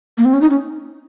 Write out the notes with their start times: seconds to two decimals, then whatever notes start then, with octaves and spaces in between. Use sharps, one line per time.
0.18 A#3
0.25 C4
0.33 C#4
0.41 D#4
0.50 C#4